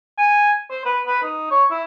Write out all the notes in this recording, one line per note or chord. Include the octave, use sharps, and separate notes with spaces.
G#5
C5
B4
B4
D#4
C#5
E4